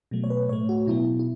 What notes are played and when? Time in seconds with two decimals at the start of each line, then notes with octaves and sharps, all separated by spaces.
0.11 B2 F#3 A3
0.24 C#5
0.30 B4
0.49 A2 A3 C#5
0.69 F#4
0.87 B2 F#3 B3 E4
1.19 E4